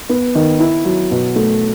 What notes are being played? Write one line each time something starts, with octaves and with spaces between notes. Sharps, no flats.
B3
D#3
E4
F#3
B2
A3